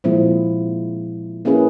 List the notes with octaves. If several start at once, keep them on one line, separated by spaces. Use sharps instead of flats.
A#2 F3 G#3 C4 E4
A#3 C#4 E4 G#4 B4